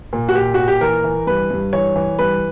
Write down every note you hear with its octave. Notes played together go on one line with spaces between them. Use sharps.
A#2
F#4
A#2 G4
A#2 F#4
G4
E3 A#4
E3
G2 B4
G2
E3 C#5
E3
G2 B4